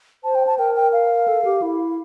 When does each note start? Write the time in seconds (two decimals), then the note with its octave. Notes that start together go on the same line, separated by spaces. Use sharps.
0.24 C5 A5
0.35 G5
0.47 A5
0.59 A#4 G5
0.76 G5
0.93 F5
1.28 A4
1.45 G4
1.62 E4